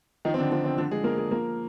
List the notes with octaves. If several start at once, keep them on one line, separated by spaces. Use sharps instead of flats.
D#3 F3 D#4
C4
D3 D4
F3 C4
C4
D3 F3 D4
G#3 G#4
F3 A#3 A#4
G#3 G#4
F3 A#3 A#4